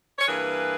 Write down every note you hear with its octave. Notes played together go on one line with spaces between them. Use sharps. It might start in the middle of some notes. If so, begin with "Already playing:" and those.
C#5
G2 E3 A#3 G#4 B4